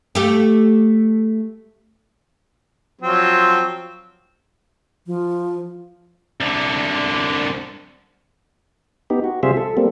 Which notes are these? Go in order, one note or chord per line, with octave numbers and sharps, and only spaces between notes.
A3 G4
F3 F#3 C4
F3
C2 D3
B3 D#4 G4
F#4
C3 G3 F4 G#4 C5 E5
A4
G3 A#3 C4